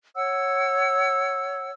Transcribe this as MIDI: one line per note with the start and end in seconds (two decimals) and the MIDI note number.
0.16 1.72 73
0.16 1.72 78
0.16 1.72 88